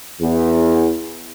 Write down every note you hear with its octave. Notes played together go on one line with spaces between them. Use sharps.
E2